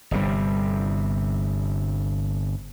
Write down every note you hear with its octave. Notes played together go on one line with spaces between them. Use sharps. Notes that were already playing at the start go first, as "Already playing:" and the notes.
G1 C3 G3